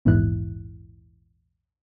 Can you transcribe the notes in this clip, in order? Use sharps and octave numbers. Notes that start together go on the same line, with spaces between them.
A#1 E2 G#2 E3 E4 F#6